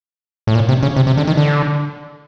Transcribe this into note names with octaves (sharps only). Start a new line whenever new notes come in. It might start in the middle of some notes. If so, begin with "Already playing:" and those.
A2
A#2
C3
C#3
C3
C3
D3
D#3
D3